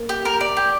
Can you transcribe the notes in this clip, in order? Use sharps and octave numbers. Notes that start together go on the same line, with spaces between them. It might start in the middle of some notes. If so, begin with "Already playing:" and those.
Already playing: A#3
G4
A#4
D5
G4